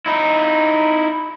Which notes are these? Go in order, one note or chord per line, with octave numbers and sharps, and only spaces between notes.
D#4 E4